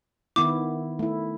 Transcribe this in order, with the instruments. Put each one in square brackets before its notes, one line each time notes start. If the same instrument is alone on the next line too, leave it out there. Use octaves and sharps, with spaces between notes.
[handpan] D#3 B3 E4 [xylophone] D6
[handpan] A3 E4